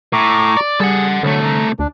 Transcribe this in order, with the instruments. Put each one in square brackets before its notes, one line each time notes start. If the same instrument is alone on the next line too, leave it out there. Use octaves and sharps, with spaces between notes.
[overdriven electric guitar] A2 [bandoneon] A#5 C#6 D6
[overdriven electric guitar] D5
[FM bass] G3 [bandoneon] G#4 [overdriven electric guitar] A4 F#5
[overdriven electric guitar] C2 A3 [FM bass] D3 [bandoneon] F#3
[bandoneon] A#5
[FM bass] D2 [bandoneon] D4